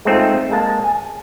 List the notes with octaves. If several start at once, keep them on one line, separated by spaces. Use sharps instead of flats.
G#3 A3 C4 D#4 F4
G#3 A#3 A5
G#5